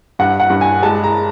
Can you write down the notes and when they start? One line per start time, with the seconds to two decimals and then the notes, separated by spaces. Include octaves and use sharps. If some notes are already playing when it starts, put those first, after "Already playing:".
0.19 G2 F#5
0.40 F#5
0.50 G2
0.61 G#5
0.83 G#3 A5
1.04 A#5